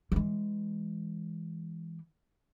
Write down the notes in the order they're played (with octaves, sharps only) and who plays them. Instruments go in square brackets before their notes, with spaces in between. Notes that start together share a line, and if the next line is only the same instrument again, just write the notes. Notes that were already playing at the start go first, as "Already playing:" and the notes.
[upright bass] E3 G#3